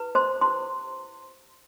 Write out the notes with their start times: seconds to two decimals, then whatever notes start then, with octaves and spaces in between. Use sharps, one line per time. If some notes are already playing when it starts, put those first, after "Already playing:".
Already playing: E4 G4 B4
0.15 C5 C6
0.41 E4 G4 B4 C5 C6